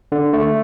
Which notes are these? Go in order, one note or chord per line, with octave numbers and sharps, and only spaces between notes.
D3
A3